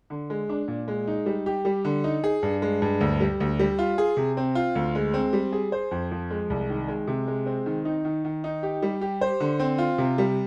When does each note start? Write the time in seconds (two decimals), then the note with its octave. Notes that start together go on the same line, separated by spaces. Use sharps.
0.10 D3
0.30 G#3
0.49 D4
0.68 A#2
0.88 G#3
1.07 D#4
1.26 G3
1.46 G4
1.65 G3
1.85 D3
2.04 D#4
2.24 G#4
2.43 G2
2.62 G#3
2.82 G2
3.01 D2
3.20 G3
3.40 D2
3.59 G3
3.79 F4
3.98 G#4
4.17 C3
4.37 C4
4.55 F4
4.75 D2
4.95 G#3
5.14 C4
5.33 G3
5.53 G#4
5.72 C5
5.91 F2
6.11 F3
6.31 G#3
6.50 C2
6.70 D#3
6.88 G#3
7.07 C3
7.28 G#3
7.46 C4
7.66 D#3
7.85 D#4
8.05 D#3
8.25 D#3
8.44 D#4
8.63 G4
8.82 G3
9.01 G4
9.21 C5
9.40 D3
9.60 C4
9.78 F4
9.98 C3
10.18 G3